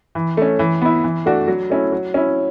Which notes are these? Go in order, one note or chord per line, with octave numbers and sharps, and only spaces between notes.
E3
A3 C#4
E3
B3 E4
E3
A3 D4 F#4
F#3
A3 C#4 E4
F#3
C#4 E4